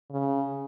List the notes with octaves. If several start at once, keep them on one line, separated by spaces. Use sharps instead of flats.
C#3